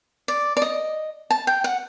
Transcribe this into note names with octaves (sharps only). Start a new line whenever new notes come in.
D5
D5
D#5
A5
G5
F#5